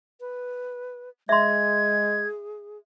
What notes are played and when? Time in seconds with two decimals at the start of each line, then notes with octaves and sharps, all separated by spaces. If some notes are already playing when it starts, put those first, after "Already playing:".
0.20 B4
1.29 G#3 G#4 E5 C6 G#6